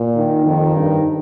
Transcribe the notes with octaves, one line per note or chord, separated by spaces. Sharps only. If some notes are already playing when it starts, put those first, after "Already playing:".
Already playing: A#2
D#3
F2 D#3
G2